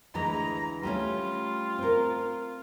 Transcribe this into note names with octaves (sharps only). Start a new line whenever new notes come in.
D2 E3 G#3 A#5
G3 A3 C#4 F4
C4 A#4